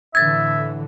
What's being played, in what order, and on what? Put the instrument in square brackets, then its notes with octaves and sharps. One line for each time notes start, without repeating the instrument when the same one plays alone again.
[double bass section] A2 D3 E3 [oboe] E5 [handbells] G#6 A6